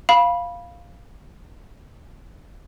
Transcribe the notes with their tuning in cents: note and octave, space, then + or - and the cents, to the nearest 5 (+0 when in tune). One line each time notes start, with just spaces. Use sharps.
F5 +0 B5 -15